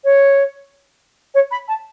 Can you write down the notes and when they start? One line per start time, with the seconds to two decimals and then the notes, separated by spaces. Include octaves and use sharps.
0.04 C#5
1.34 C#5
1.51 B5
1.68 A5